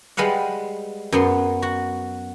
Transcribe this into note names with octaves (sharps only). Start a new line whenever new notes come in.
G3 G#3 B4 F5 F#5
F#2 B3 C6
F#4